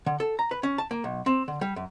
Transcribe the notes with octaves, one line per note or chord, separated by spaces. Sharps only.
D3
A4
A#5
B4
C#4
A5
A#3
B1
C4
D3
G3
F#2